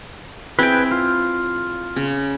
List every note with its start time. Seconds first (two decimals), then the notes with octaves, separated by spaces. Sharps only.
0.59 C4 E4 G#4 B4 G5
0.91 F4
1.96 C#3